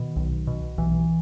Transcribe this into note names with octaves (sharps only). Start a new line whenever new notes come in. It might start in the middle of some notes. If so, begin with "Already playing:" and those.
Already playing: B2 D#3
B1
B2
B1 E3